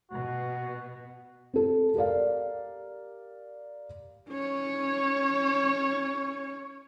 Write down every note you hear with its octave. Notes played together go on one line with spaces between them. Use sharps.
B2 F#4
C4 A4
G4 A#4 D5 F5
C#4 C#5